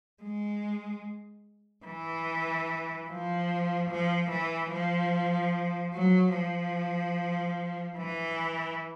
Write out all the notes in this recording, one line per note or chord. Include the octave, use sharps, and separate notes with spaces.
G#3
E3
F3
F3
E3
F3
F#3
F3
E3